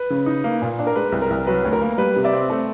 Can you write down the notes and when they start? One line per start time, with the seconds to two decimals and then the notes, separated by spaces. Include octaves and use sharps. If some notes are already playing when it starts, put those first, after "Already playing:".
Already playing: B4
0.10 C#3
0.26 D#4
0.44 A#3
0.62 A#2
0.79 D4
0.87 A#4
0.95 G#3 B4
1.12 C2
1.22 A#4
1.30 C2
1.47 F#3 B4
1.65 D2
1.73 A#4
1.82 A#3
1.98 G3 B4
2.16 C3
2.24 D5 E5
2.33 C4
2.50 A3